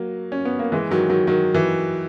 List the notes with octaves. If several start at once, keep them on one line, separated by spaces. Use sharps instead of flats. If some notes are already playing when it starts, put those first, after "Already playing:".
Already playing: F#3 A#3
C#4
B3
A#3
E3 G#3
D#3 F#3
D#3 F#3
D#3 F#3
E3